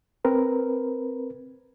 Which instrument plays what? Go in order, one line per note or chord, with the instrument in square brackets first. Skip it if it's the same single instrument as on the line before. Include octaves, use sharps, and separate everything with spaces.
[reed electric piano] C4 A#4 B4